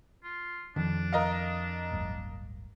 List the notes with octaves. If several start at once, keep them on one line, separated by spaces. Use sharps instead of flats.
F4
F2 D#3 D4
A#4 D#5 F5
D1 G1